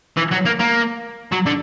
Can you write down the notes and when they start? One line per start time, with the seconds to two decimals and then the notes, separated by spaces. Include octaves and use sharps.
0.17 E3
0.32 F#3
0.46 A#3
0.60 A#3
1.32 F#3
1.46 D3